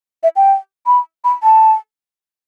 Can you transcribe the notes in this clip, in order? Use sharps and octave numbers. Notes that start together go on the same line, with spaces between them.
E5
G5
B5
B5
A5